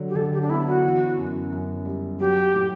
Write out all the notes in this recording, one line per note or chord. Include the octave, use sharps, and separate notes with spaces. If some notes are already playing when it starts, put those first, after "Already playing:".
Already playing: D3 F#3
G4
D3 A4
G4
D4
B3 E4
F#4
E3
F#2
F#2
G3
F#3 G4
A2